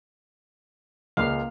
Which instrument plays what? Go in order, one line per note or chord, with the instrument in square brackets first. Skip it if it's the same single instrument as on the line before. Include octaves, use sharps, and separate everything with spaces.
[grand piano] C#2 C#3 [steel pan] A#3 F5